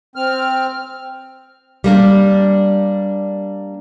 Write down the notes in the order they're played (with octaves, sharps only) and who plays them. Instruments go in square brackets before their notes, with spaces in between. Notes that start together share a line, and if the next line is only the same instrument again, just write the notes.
[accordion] C4 F6
[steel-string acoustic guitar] G3 A#3 D4